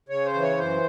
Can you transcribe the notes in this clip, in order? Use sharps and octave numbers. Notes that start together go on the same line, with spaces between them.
C#3 C#5
C5
E3
C#5
F#2 C5